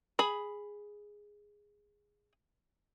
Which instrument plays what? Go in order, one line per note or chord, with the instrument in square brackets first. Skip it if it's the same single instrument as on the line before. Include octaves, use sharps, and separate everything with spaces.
[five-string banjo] G#4 B5